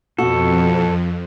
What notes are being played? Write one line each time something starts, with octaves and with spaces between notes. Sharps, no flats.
F2 B2 F#4 A4